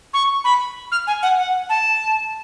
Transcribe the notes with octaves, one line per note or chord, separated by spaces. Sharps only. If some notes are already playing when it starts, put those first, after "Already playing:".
C#6
B5
F6
G#5
F#5
F#5
A5